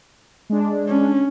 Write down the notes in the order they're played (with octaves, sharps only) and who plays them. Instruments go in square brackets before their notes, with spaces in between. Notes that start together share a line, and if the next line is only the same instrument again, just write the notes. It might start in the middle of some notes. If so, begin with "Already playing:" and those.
[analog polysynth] G#3 D4
[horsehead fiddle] C#4